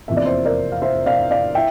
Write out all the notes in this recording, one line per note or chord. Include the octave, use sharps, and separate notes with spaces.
F1 E2 C3 F3 A#3 E5
D5
C5 E5
A#4 D5
F5
C5 E5
D5 F5
D5 F5
E4 E5 G5